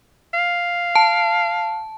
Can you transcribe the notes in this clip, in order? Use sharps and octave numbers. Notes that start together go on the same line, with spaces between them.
F5
A5